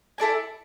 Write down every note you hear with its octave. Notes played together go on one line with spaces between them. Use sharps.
E4 A4 D5 G#5